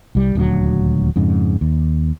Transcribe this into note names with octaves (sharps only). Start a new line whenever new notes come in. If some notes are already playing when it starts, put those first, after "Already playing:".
C2 G3
D#1 D2 F#3
F2 G#2 C#3
D#2